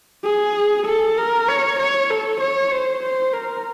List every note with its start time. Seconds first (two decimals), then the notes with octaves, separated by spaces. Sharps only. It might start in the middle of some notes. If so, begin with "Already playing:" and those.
0.24 G#4
0.86 A4
1.17 A#4
1.48 C#5
1.79 C#5
2.10 A4
2.40 C#5
2.72 C5
3.02 C5
3.33 A#4